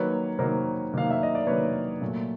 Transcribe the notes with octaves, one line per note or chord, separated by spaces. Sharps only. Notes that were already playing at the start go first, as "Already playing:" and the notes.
Already playing: D#3 F#3 A#3 B4 C#5
D#3 F#3 A#3 A#4 C5
D#3 F#3 A#3 F5
E5
D#5
D5
D#3 F#3 A#3 B4 C#5
A#2 F#3 A3